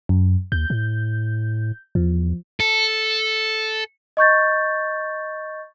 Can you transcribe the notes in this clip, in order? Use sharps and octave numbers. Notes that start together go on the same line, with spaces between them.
F#2
D#2 G6
A2
E2 F3
A4
D#5 C#6 G6 A6